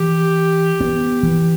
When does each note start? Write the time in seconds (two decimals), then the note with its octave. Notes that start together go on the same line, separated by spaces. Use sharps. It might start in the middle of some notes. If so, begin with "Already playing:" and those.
Already playing: E3 G4
0.80 B3
1.23 E3